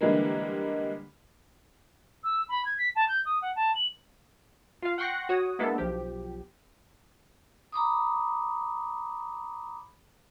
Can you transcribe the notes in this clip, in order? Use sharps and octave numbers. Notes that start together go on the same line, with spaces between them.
D3 E3 G3 G#3 A#3
E6
B5
G#6
B6
A5
G6
D#6
F#5
A5
F#7
F4 F5
F#5 G5 C6 C#6 F#6 A#6
F#4 C#5 D#6
G#3 A#3 B3 D4 E4 A4
B1 F3 G4
A#5 B5 D6 D#6